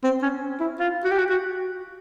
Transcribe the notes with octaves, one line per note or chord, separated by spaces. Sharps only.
C4
C#4
E4
F4
F#4
G4
F#4
F#4